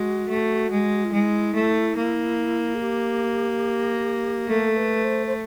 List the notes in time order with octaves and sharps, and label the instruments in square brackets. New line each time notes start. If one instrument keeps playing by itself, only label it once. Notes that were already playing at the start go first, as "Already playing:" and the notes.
Already playing: [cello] G#3 [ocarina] F#4
[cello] A3
G#3
[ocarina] F4
[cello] G#3 [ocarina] E4
[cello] A3
A#3
[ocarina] G#4
G4
[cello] A3 [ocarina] A4
[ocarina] A#4
A4
B4
C5
C5